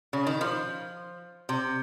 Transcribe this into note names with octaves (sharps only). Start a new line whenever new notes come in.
C#3
D#3
F3
C3